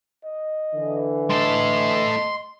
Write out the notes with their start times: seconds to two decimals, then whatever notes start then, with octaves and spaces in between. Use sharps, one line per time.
0.25 D#5
0.74 D3 E3
1.30 A2 A4 D#5 C6